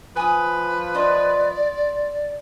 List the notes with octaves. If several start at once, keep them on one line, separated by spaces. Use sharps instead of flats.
F3 B4 G#5 D#6
F4 C5 D5 D#5